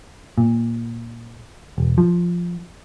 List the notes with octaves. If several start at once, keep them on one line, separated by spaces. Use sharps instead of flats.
A#2
E1
F3